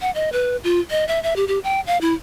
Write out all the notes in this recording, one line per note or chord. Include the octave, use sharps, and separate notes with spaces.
F#5
D#5
B4
F4
D#5
E5
E5
G4
G4
G5
F5
E4